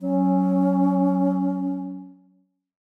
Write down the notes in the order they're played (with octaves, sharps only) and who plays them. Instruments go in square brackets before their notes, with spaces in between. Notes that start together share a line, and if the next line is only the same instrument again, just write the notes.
[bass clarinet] F#3 [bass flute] C#4